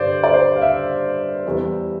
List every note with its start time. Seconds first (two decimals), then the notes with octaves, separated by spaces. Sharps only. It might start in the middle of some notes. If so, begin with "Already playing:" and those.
Already playing: G2 D3 G3 C5 D5
0.24 D5
0.34 C5
0.56 F5
0.62 E5
1.46 E2 E3 G3